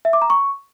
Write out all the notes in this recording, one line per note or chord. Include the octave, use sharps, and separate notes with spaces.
E5
D6
A#5
C#6